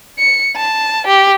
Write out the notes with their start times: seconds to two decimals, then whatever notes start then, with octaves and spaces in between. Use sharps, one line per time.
0.19 C#7
0.56 A5
1.07 G4